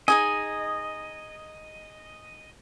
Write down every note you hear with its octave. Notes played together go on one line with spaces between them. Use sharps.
D#4 G#4 D#5 G#5